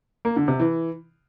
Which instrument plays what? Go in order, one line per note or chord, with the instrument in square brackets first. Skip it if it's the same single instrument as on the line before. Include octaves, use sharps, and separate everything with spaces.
[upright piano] A#3
D3
C3
E3